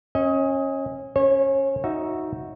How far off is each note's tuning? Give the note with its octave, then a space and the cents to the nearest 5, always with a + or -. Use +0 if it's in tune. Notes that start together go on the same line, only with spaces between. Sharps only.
C#4 -25 D#5 +20
C#4 +0 C#5 -35
D#4 +10 F#4 -10 E5 +0